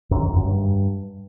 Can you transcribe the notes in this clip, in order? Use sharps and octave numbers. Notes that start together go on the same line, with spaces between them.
F#2
D#3
F2
F#2
G2